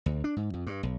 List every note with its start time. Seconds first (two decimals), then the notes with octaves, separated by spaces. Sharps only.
0.06 D2
0.24 D4
0.36 G#2
0.54 F2
0.67 G2
0.83 B1